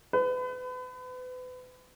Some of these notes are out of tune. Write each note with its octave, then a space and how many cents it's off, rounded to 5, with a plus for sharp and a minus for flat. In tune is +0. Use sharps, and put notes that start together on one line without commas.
B4 +35